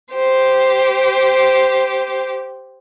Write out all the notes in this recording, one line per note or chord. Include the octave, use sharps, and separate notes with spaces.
G4 C5